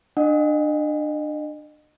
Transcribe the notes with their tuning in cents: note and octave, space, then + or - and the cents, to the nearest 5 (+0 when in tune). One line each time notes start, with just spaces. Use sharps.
D4 +25 D#5 -30 F#5 +0